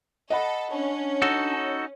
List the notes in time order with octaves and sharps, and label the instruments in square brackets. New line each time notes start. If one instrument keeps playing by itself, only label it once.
[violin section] A4 [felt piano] D#5 F#5 B5
[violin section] C#4 [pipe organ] D4
[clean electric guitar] D#4 F#4 A4